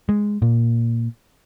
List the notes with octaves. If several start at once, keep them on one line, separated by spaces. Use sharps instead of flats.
G#3
A#2